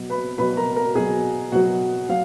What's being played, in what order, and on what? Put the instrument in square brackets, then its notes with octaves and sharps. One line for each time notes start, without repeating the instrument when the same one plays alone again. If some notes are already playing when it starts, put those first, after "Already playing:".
Already playing: [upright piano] B2 F#3
B4 B5
B2 F#3 B4 B5
A#4 A#5
A#4 A#5
B2 F#3 G#4 G#5
B2 F#3 F#4 F#5
F#3 F5